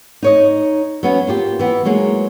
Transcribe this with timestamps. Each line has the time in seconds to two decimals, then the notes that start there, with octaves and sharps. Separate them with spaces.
0.22 D#4 C#5 D#5
1.03 F#3 B3 C#4
1.27 A#3 F4 G4
1.59 E3 B3
1.85 F#3 G#3 A#3 D#4